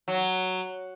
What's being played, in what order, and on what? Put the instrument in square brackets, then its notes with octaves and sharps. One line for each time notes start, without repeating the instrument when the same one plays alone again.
[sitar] F#3